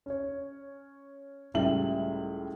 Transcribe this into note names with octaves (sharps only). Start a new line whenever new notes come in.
C#4 C#5
C#2 A2 G3 G#4 E5 F#7